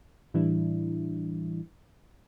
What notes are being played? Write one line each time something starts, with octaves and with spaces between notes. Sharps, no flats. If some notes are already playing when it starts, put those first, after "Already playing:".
A2 E3 G3 D4 E4